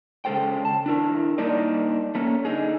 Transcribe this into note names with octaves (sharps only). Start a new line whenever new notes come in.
C#3 G#3 D4 A4 C5 G5
A5
D4 E4 A#4
G3 A#3 D4 D#4 A#4 D5
A3 A#3 C#4
D3 D#4 G#4